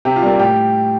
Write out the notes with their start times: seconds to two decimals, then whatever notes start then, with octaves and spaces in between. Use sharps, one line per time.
0.05 C3 G4
0.16 F4
0.23 G3 A#3 G4
0.39 A2 G4